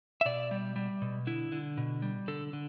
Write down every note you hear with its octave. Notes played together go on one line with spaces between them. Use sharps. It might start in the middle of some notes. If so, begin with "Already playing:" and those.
E5
B2 D5
G3
G3
B2
D3 E4
D3
B2
G3
D3 A4
D3